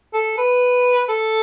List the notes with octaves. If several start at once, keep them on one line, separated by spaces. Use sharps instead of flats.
A4
B4
A4